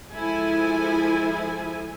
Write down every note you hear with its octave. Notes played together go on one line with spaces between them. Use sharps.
F3 G#3 E4 G#4 A4 G#5